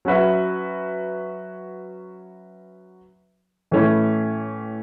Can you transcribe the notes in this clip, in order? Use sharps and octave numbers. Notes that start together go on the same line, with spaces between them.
F#3 C#4 F#4 B4 E5
A2 E3 A3 C#4 E4